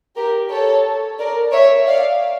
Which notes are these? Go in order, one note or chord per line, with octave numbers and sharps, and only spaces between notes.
G4 A#4
A4 C#5
A#4 D5
C#5 E5
D5 F5